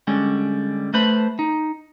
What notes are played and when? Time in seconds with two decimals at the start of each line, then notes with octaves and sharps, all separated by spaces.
0.07 D3 G3 G#3 C#4
0.94 A3 B4 C5 A5 B5
1.39 D#4